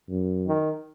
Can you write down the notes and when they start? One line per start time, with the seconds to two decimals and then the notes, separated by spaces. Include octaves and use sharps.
0.09 F#2
0.48 D#3